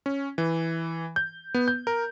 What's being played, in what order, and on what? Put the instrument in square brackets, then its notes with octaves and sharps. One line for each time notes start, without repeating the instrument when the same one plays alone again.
[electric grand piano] C#4
E3
G6
B3
G6
A#4